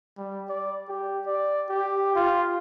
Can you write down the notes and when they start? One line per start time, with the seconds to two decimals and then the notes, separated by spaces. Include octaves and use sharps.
0.17 G3
0.49 D5
0.88 G4
1.26 D5
1.69 G4
2.15 F4